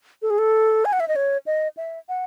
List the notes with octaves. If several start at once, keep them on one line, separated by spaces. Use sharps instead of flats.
A4
G#4
A4
G#5
F#5
E5
D#5
C#5
D#5
E5
F#5